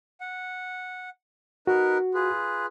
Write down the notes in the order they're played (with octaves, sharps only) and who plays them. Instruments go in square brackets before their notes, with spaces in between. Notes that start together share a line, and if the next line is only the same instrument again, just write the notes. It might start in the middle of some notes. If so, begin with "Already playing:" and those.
[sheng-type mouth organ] F#5
[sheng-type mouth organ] D#4 A#4 B4 [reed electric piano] F#4
[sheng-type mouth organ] F4 G#4 B4